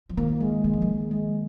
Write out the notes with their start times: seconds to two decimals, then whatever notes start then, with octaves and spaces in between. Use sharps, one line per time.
0.09 F3
0.17 D#3 A#3
0.41 G#3
0.64 D#3 G#3
0.73 F3
0.82 D#3
1.11 G#3